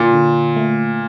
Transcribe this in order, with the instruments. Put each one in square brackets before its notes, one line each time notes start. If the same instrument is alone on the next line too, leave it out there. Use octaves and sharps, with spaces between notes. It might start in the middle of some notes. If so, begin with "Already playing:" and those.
Already playing: [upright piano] A#2 [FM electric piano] D3
[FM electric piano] D3
A3